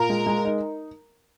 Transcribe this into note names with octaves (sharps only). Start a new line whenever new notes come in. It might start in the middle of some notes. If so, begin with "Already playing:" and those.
Already playing: A#2 A#4
G#3
G#3
D#4